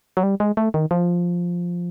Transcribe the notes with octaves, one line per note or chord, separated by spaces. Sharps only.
F#3
G3
G#3
A3
D#3
F3